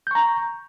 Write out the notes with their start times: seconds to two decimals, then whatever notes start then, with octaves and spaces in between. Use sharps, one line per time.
0.07 G6
0.11 C#6
0.15 A#5